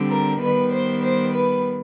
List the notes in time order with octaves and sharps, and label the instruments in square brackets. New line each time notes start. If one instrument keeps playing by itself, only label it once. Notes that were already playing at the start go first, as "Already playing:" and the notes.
Already playing: [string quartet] D3 G3 C4
A#4
D#3 G3 B3 B4
C5
C5
B4